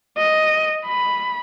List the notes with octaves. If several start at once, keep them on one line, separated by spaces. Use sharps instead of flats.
D#5
B5